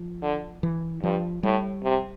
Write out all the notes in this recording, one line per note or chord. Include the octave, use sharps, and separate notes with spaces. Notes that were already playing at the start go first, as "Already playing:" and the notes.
Already playing: F3
D3
E3
G2 F3
A2 G3
C3